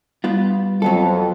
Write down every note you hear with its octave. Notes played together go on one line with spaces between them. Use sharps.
G3 B3 F4
F2 F#3 B3 A4